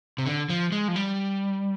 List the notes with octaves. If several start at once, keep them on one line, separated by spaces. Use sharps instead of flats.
C3
D3
F3
G#3
F3
G3